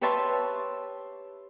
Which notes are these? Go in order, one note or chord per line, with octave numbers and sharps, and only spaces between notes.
G4 B4 C#5 E5 A5 C6